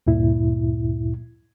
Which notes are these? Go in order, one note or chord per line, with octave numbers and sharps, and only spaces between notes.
D2 G2 A#2 E4